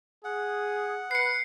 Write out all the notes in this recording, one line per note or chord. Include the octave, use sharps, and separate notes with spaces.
G#4 F#5
B4 F#6 C7 C#7